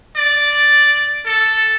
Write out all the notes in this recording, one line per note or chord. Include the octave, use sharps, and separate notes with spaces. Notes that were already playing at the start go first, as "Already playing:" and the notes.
D5
A4